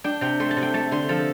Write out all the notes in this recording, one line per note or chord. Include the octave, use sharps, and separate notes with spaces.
D4 G5
C3 G5
A3 C6
A5
C3
G5
A3 A5
D3 C6
F3 A4